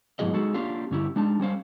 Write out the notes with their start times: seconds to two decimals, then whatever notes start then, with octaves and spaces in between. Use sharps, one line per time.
0.19 G#2 B2 F#3 E4 G#4 D#5
0.33 G#3 D#4 F#4 G#4 A4
0.54 A#3 C#4 D4 F4 G4 F5
0.91 G2 D3 C#4 E4 G4
1.16 G#3 D4 D#4 A5
1.40 G3 C#4 C5 F5